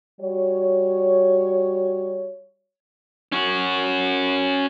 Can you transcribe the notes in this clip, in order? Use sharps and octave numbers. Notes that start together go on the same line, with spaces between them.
G3 F#4 C#5
C#4 F#4